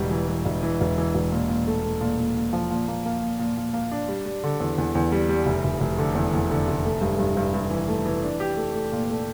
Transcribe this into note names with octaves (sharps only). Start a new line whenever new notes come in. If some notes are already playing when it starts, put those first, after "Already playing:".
Already playing: E1 G3
E3
E3
E1
E3
E1
E3
E1
A#2
A#2
A3
A3
A#2
A#2
A#2
F3
A#2
A#3
A#3
A#2
A#2
A#2
A#3
D4
G3
G3
D3
E2
E2
E2
G3
G3
F1
F1
F1
D3
E2
E2
D3
F1
A3
G2
G2
G2
G2
E3
A3
E3
D4
G4
A3
A3
A#2
A3